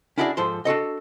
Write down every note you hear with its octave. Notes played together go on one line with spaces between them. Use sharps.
C#4 D4 E4 F#4 G#4 D5
G#2 F3 A4 C5 C6
D4 F#4 A4 D#5